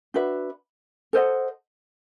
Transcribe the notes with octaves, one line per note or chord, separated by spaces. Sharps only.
D4 F#4 B4 E5
A4 C5 D#5 F#5